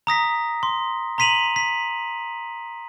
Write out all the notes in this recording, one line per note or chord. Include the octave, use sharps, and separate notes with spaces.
A#5 D#6 A#6 B6
C6
A#5 C6 B6 D#7 F7 F#7
B6